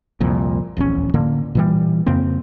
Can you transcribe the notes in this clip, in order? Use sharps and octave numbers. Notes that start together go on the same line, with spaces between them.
C2 F2 A#2
D1 A#1 E2 C#4
A2 D3 A#3
A#2 E3 G3
F2 C#3 A#3 C4